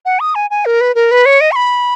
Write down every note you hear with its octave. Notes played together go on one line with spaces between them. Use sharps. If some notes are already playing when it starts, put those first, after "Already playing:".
F#5
D#6
G#5
G#5
A#4
B4
A#4
B4
C#5
D#5
C#6
B5